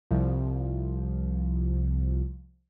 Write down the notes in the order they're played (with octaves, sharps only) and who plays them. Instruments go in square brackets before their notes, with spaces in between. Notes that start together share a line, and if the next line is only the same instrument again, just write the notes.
[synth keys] C2 F3